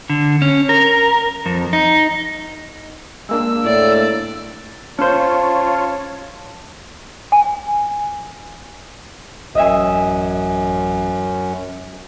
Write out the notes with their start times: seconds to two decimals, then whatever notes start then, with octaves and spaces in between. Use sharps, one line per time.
0.10 D3
0.42 C#4
0.69 A#4
1.46 F2
1.73 D#4
3.29 G#3 A#3 D4 E6
3.64 A2 D5
4.99 C#4 F4 C5 C#5 A5
7.32 G#5
9.55 A1 F#2 D#5 E5 G#5